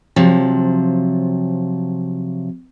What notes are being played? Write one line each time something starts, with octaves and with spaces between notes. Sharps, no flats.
C3 F3 F#3